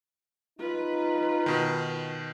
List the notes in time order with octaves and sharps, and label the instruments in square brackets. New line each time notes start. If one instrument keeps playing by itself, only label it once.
[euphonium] D#4 [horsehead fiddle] F4 B4
[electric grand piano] B2 D#3